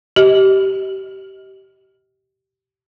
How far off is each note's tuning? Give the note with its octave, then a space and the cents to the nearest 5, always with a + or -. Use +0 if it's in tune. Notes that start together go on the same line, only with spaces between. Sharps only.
G4 -25 D#5 +25